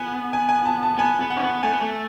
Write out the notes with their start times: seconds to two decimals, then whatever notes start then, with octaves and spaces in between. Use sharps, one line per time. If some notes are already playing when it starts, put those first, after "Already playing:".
Already playing: B3 G#5
0.33 G#5
0.49 G#5
0.65 A5
0.83 A5
0.98 B3 G#5
1.21 B3
1.30 F#5
1.37 C#4
1.42 B3
1.63 A3 G#5
1.73 B3
1.81 A3